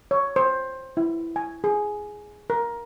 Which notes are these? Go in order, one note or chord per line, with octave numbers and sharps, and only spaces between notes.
C#5
C5
E4
G#5
G#4
A#4